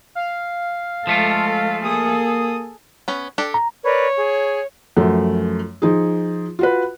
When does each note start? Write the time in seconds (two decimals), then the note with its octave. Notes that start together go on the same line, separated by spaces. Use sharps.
0.15 F5
1.07 F3 G#3 A3 F4 A4
1.83 A#3 G#4 A4 D#6
3.08 B3 C#4
3.38 D4 G4 A4
3.54 A#5
3.84 A#4 B4 C#5 D5
4.15 G#4
4.97 F#2 F3 A3
5.82 F3 D#4 G#4
6.59 F4 F#4 B4